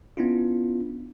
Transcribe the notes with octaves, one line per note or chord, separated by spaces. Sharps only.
B3 C#4 D4 E4 F4